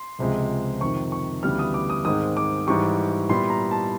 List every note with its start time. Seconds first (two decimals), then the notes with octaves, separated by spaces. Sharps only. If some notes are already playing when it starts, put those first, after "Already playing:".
Already playing: C6
0.19 C#2 C3 F3 G#3
0.80 F2 C3 D#3 C#6
1.12 C#6
1.43 D2 C#3 E3 G3 B3 F6
1.59 D#6
1.74 D6
1.90 D#6
2.05 G#2 D#3 G#3 C4 D#6
2.37 D6
2.67 G#2 E3 G3 C#6
3.29 A#2 G3 B3 E4 C6
3.50 A#5
3.71 A5